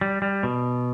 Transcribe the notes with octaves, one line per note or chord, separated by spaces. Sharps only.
G3
G3
B2